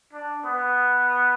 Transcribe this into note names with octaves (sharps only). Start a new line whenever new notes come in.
D4
B3